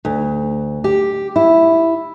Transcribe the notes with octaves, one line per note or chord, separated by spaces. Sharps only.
D2
G4
E4